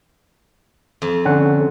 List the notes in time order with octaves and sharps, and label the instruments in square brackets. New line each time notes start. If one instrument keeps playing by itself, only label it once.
[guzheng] F2
[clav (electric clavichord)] D3 C#4 F#5